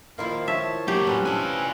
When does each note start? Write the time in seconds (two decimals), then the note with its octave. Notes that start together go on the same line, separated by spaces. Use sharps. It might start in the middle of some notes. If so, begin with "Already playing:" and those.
0.18 D#3 F3 A#3 E4 F4 F5
0.48 C#5 E5 A5
0.88 F#3 A#3 G4
1.07 F2 A2 C4 C#4 B4
1.26 E3 D4 F4 G#5